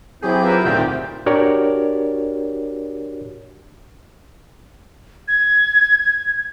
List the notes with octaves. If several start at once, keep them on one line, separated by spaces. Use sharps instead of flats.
F#3 C4 E4 G4 G#4 G6
E4 F4 A#4 B4 E5
D2 A2 D#3 C4 F4 G4 D5
D4 F#4 G4 A#4 C#5 D5
G#6